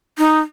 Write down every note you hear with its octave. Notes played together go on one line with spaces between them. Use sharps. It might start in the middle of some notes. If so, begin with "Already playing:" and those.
D#4